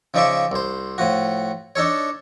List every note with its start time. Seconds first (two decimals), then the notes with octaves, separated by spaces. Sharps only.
0.14 C#3 F3 D#4 D5 E5 C#6
0.51 C2 C5
0.98 A2 F3 F#4
1.76 D4 D#4 A4 C#5